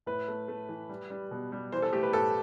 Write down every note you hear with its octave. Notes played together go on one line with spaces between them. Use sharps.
A2 B4
A3
A3
E3
G3
G3
B2
G3
E3 C5
A4
A3 G4
B4
A2 A4